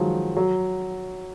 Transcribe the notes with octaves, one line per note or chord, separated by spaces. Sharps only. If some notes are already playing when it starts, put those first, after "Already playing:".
Already playing: D#3 F3 F#3 G#3
F#3